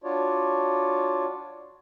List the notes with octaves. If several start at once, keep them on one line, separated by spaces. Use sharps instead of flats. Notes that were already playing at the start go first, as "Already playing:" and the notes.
D4 F4 F#4 C#5 D5